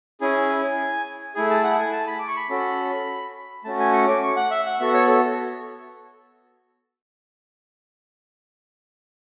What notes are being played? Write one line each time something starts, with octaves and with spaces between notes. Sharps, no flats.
C#4 E4 G#4 G#5
A3 E4 G#4 G#5
A5
F#5
G#5
A5
B5
D6
C#6
B5
C#4 F#4 A4
A3 C#4 F#4 A5
G#5
C#6
D6
C#6
F#5
E5
F#5
B3 F#4 A4 E5
C#5
A4